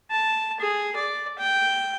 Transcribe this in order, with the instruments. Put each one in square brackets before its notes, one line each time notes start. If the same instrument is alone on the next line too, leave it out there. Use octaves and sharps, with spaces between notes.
[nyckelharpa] A5
G#4
D5
G5